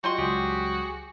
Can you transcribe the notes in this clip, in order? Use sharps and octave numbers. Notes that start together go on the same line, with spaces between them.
F#3 G3 F4 F#4 D#5 C6
C#2 F#3 G4 G#4 G6